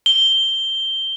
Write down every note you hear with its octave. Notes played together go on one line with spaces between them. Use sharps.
G7